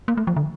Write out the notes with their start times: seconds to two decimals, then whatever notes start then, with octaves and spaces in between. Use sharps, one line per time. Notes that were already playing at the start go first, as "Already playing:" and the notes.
0.08 A#3
0.17 A3
0.27 F3
0.36 D3